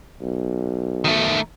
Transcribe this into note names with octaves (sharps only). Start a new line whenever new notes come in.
B1
D#3 A3